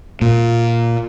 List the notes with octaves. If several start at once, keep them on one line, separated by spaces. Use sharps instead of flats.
A#2